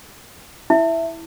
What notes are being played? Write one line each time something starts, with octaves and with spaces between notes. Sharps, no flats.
E4 E5